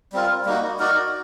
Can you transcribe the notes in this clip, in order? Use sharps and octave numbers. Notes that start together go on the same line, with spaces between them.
G3 C4 F4 A#4
G3 A#3 D#4 F#4
D#4 F#4 A#4 D5